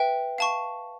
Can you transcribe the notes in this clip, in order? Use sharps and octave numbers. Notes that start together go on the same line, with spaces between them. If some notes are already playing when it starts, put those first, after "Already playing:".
Already playing: B4 E5 G5
F5 A5 C#6